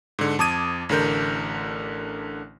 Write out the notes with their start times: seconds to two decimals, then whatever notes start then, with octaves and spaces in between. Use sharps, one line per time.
0.19 G#2 D3
0.39 F2 A5 D6 D#6 G#6 D#7
0.89 A1 D3 A#4 G6